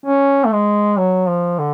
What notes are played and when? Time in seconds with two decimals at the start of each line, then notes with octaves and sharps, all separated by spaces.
0.06 C#4
0.45 A3
0.52 G#3
0.97 F#3
1.28 F3
1.59 D3